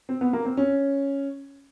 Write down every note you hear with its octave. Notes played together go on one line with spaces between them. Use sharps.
C4
B3
A#3
C4
C#4